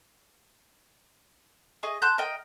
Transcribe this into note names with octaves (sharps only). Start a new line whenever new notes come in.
G#4 D#5 C#6
A5 C6 F#6 G6
A#4 D#5 G5